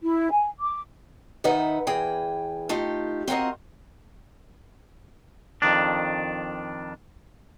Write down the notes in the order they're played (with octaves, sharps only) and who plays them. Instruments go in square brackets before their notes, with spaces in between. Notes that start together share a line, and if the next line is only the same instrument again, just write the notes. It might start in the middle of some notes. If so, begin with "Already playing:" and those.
[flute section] E4
G#5
D6
[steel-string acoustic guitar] D#3 D#4 B4 E5 F#5
E2 E3 G#4 G5
A3 D#4 F4 G4
C4 F4 F#4 A#4 D#5
[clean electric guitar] F2 D#3 D4